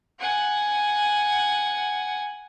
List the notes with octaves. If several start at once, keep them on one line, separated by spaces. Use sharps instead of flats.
F#5 G#5